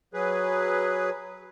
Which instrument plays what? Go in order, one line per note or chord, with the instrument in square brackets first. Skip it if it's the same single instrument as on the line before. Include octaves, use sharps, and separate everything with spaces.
[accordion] F#3 G#4 B4